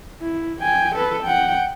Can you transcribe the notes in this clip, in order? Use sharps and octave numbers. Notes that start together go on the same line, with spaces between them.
E4
G5 G#5
A4 B4
F#5 G5